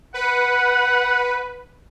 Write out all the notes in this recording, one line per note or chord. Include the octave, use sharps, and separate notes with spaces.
B4 F#5